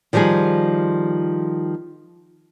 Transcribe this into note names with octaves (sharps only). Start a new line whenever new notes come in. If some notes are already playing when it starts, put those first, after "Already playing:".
D#3 F3 G3 D#4 G#4